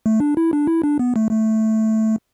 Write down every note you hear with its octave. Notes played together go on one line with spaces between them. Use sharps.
A3
D4
E4
D4
E4
D4
B3
A3
A3